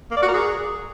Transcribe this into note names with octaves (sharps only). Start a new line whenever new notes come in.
A#3
D5
F#4
A#4
G#4